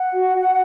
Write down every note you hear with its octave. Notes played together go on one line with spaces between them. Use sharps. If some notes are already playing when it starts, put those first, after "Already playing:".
Already playing: F#5
F#4